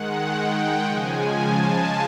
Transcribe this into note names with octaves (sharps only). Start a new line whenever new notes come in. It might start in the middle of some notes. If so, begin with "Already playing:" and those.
Already playing: D#3 G#3 F#5
G5
C#3 F3 G#3 G#5
A5